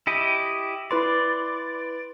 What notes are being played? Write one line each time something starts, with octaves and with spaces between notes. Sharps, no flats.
E4 G4 D#5
E4 B4 D5 C6